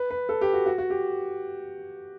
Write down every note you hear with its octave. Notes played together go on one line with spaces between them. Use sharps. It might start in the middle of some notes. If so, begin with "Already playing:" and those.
Already playing: B4
B4
A4
G4
F#4
F#4
F#4
G4